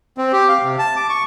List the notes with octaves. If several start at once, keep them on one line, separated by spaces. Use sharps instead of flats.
C4
G4
F5
C3
A5
D6
C#6